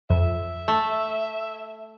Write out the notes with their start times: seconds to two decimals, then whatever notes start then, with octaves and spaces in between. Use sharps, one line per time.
0.10 F2 E5
0.68 A3